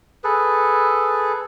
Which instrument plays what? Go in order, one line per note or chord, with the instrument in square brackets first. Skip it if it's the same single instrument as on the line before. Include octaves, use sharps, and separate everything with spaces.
[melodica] G#4 A4 B4